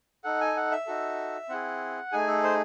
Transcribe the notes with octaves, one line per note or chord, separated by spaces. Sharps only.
D#4 A4 F#5
G#5
F#5
E5
D#4 F#4 A4
C4 E4 G#4 F#5
A3 D#4 G#4 G#5
A4
C5